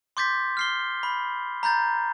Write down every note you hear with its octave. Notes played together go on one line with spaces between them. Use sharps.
C6 D6 G6 A6 B6
F6 C7 G7
B5
A#5 B5 G6 A6